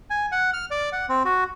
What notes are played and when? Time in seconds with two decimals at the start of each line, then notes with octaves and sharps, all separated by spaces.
0.10 G#5
0.32 F#5
0.53 F6
0.71 D5
0.93 F#5
1.09 C4
1.25 F#4